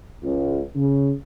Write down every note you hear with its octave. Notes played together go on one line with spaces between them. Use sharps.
C#2
C#3